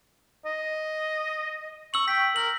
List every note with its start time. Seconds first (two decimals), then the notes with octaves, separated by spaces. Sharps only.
0.46 D#5
1.94 C#6 E6 F#7
2.08 G5 B6
2.36 A#4 F#7